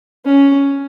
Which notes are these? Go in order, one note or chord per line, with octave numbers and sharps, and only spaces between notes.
C#4